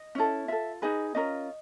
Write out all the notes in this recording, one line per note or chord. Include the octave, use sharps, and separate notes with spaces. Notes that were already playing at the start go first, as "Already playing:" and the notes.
Already playing: D#5
C#4 E4 A4
F4 A4 E5
D#4 G#4 B4 D#5
C#4 F4 A#4 D#5